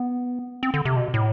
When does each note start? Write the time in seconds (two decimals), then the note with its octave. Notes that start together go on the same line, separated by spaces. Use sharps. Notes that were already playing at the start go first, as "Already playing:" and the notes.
Already playing: B3
0.63 C4
0.74 D3
0.85 C3
0.96 B2
1.14 A2